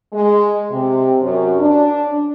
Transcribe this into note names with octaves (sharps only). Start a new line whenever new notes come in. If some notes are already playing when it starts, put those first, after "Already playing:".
G#3
C3
F#2
D4